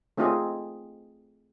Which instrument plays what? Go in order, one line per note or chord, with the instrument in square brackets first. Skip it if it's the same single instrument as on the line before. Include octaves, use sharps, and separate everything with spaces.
[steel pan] A3 C4 D#4 F4 G#4 D#5